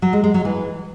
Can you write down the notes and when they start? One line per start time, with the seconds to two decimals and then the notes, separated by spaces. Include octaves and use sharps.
0.02 F#3
0.13 G#3
0.24 G#3
0.34 F#3
0.45 E3